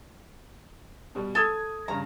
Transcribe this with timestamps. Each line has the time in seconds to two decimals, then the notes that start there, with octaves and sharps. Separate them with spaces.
1.15 B2 G3
1.35 A4 D#6 G#6
1.88 G2 C#3 A#5